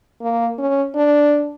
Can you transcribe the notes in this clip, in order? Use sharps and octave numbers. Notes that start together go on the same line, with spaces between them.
A#3
C#4
D4